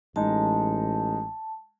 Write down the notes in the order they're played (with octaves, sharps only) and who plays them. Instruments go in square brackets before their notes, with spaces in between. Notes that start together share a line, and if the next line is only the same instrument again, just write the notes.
[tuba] A1 [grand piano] G#3 D#4 [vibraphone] A5